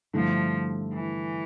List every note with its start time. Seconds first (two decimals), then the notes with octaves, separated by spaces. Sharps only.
0.13 G2 D3 F3 A3 E4
0.93 E3